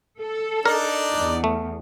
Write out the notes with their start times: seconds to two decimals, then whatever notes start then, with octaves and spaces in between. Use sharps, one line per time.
0.22 A4
0.66 D4 D#4 A#4 D5
1.15 E2
1.44 A3